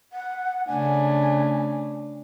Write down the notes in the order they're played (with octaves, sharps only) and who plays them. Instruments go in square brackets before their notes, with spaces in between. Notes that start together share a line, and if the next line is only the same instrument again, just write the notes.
[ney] F#5
[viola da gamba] C#3 A3 D4 [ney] G#5